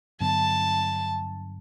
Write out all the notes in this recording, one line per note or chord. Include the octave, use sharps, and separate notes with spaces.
G2 D3 F#3 B3 A5